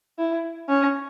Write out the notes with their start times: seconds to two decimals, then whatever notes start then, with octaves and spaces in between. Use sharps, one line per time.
0.19 E4
0.69 C#4